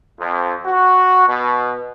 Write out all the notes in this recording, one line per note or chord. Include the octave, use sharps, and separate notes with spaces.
F2
F#4
B2